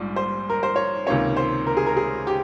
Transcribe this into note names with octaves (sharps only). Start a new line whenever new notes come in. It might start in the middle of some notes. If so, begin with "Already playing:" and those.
Already playing: A#1 G#2 G3
C5
A#4
C5
C#5
C#2 C3 D#3 A#3 C#4 C#5
C5
A#4
G#4
A#4
G#4
G4